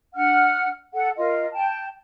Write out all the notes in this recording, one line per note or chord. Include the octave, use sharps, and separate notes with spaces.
D4 F#5 F6
A4 F#5
F4 A#4 D#5
G5 A5